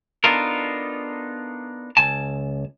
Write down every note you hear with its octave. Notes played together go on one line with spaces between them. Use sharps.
B3 D4 D#4 F4 A4 A#4
C#2 G#5 A5